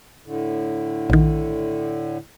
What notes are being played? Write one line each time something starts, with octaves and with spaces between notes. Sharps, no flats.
A2 D3
A#1 D#3